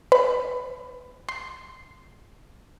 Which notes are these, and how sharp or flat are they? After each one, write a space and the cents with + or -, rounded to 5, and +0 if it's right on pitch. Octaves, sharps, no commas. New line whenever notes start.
B4 +15
C6 -10